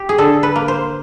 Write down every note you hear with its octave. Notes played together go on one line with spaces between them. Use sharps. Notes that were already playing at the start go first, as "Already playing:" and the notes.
Already playing: G4
G#4
D3 A4
B4
A#3
C5